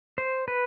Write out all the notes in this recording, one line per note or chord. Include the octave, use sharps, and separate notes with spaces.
C5
B4